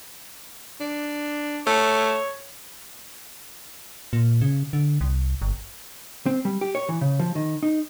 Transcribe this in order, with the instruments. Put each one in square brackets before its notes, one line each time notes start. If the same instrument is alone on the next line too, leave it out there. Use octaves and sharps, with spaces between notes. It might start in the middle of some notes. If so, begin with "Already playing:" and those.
[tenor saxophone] D4
[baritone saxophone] A3 [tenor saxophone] C#5
[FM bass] A#2
C#3
D3
C2
G1
[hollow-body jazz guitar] C4
G3
G4
C#5
E3
C#3
F3
D#3
D#4